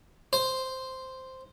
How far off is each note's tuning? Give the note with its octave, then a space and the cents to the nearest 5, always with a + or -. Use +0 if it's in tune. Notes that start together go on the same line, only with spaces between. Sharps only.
C5 -5